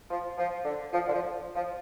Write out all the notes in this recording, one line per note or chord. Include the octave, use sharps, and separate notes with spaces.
F3
F3
D3
F3
D3
F3
F3